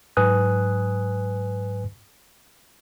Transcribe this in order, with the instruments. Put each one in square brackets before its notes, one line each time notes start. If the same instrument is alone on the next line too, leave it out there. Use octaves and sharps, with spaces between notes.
[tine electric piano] G#2 F#3 B4 G#5 D#6 F#6